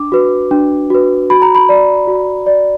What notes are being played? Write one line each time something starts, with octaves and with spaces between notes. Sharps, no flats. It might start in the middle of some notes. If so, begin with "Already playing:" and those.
Already playing: D4 D6
F#4 B4
D4
F#4 B4
F#4 B5
A#5
B5
D5
F#4
D5